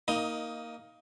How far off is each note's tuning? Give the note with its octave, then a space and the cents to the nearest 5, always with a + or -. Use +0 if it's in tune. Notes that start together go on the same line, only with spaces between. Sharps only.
A#3 +0 D#4 +20 D#5 +5